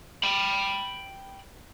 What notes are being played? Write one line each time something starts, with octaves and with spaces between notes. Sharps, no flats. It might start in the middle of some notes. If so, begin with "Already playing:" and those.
G5 B5